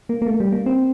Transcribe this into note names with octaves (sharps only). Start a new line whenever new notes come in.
A#3
A#3
A3
G3
A#3
C4